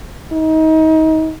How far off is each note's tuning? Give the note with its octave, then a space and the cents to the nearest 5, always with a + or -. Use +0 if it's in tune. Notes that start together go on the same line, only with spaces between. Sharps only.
D#4 +30